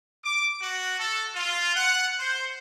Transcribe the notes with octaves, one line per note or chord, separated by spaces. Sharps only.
D6
F#4
A4
F4
F#5
C5